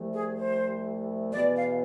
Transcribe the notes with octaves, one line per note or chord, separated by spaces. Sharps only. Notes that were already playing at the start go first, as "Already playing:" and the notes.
Already playing: C2 C3 F3 A3
G#4
C5
E2 B2 B3 D5
F5